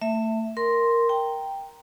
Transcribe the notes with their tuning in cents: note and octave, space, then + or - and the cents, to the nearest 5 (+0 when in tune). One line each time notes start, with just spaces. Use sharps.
A3 +25 E5 +0
A#4 +0 C6 +0
G5 +0 A#5 +0